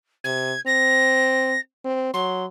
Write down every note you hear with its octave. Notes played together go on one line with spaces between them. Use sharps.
C3 G#6
C4 A#6
C4
F#3 C6